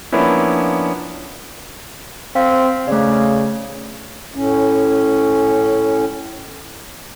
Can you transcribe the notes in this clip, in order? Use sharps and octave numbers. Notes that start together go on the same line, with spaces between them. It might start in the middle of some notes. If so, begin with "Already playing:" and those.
F3 A#3 B3 C#4 D4 E4
C4 F5
C#3 A3 D5
A2 C#4